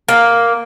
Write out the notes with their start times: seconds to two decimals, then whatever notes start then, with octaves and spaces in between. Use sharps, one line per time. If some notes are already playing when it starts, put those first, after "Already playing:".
0.09 A#3